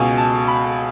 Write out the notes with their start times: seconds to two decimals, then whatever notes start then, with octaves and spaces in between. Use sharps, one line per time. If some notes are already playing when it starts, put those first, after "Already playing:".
Already playing: C#2 B2 G#5
0.17 A5
0.48 B5